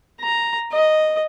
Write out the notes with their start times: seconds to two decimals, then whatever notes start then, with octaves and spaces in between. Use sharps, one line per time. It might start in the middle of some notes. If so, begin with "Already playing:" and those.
0.20 A#5
0.71 D#5